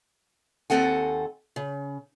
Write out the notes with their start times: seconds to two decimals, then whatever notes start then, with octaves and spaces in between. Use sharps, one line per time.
0.70 D#2 F3 C4 A4 F#5 G#5
1.56 C#3